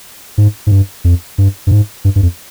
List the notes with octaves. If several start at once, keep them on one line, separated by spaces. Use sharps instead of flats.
G#2
G#2
G2
F2
G2
G2
G#2
G2
G2
F2